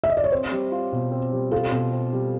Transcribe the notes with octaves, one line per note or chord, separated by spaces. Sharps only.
E5
D#5
D5
C#5
C4 C5
G3
F4
B2
C4
G3
F4 A4
B2
C4
G3